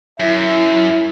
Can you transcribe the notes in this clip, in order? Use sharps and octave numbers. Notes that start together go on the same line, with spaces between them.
F#2 E4 E5